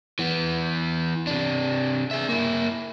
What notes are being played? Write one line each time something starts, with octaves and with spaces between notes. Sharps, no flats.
E3 B3
C3 D4
G#4 E5
A#3 E4